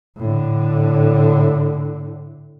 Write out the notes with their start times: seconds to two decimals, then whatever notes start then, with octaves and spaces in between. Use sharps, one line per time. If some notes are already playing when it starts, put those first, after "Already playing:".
0.18 A2 D3